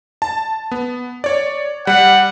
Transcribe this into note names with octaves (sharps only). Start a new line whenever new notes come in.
A5
B3
C#5 D5
G3 F#5